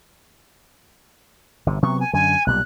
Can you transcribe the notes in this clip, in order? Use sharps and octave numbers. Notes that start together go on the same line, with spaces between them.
G1 C3
C3 F#3 B3 C#6
G#5
F#2 D3 G#5
B1 A#2 G3 F#6